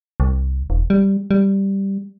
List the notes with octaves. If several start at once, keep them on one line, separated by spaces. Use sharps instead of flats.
C2
E1
G3
G3